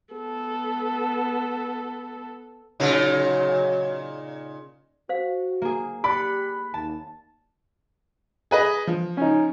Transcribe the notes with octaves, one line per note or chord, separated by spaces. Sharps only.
B3 A4
A#2 C#3 F#3 D#4
F#4 C5 F5
A#3 G#4
G4 D5 B5 F#6 C#7
D#2 A5
G#4 B4 D#5
F3
C#4 D#4